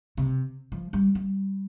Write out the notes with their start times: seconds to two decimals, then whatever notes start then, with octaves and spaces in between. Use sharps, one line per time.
0.17 C3
0.72 F3
0.93 G3
1.15 G3